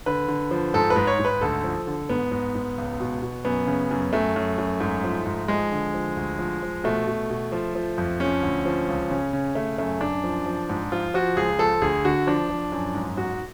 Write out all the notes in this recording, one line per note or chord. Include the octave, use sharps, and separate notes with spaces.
D3 B4
D3
F3
G#2 A4
B4
G#2
C#5
G#2
B4
D2 A4
F3
D3
G#2 B3
G#2
G#2
C#2
B2
B2
F#2 B3
C#3
F#2
F#2 A3
F#2
F#2
G#2
F3
G#2
F3 G#3
D3
F3
D2
F3
F3
B2 A3
B2
B2
F3
F3
F2
F3 C#4
D2
F3
C#2
C#3
C#3
C#3 A3
F#2 A3
F#2 D4
F3
F3
G#2
F3 F4
F3 F#4
C#2 G#4
F3 A4
D2 G#4
D3 F#4
F3 D4
F3
F#2
G#2
G#2 F#4